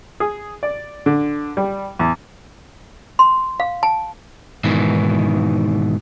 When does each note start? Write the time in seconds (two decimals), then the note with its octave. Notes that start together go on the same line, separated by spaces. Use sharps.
0.20 G#4
0.63 D5
1.06 D3
1.57 G3
1.99 E2
3.19 C6
3.60 F5
3.83 A5
4.64 G#2 B2 D#3 E3